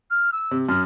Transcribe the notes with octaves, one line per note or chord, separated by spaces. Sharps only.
F6
E6
C3
F#2 F6